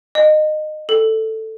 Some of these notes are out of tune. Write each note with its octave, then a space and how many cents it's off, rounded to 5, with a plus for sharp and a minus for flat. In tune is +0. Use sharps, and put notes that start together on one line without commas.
D#5 -20
A4 +5